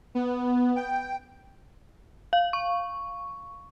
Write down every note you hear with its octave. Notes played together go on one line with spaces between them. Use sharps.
B3
G5
F5
C#6